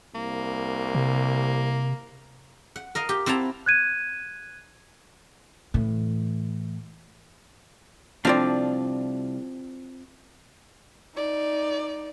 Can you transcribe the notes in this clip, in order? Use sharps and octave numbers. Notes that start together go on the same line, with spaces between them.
C2 A#3
C3
F#5
A#4 D#5 F5
G4
C4 E4 F#5 A5 A#5
F#6 G#6 D#7
A2 E3
C2 F3 C4 D4 F4 D5
D#4 D5